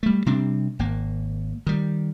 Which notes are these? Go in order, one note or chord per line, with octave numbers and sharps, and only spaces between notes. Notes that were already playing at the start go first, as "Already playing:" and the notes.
G3 A3
C3 G3 C4 D4
G#1 A#3
D#3 G3